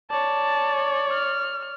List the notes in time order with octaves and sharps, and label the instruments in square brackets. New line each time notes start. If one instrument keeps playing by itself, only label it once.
[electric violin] C#5 D5 [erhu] A5
[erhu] F6